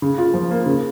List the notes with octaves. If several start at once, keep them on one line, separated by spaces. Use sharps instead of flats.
C#3
F4
F3
A#3
C#3